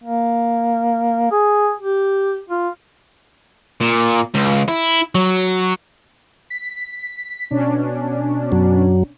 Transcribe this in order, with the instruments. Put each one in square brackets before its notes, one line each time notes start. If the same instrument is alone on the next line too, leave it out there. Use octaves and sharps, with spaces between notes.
[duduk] A#3
G#4
G4
F4
[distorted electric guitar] A#2
C#2
E4
F#3
[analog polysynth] B6
B2 C#4 D4
[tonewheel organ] F#2 F#3